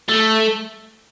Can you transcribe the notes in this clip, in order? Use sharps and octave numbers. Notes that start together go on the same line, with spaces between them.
A3